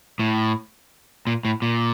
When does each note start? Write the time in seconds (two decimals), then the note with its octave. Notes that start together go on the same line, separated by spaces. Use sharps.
0.19 A2
1.27 A#2
1.45 A2
1.62 A#2